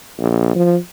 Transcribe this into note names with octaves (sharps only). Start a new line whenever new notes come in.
A#1
F3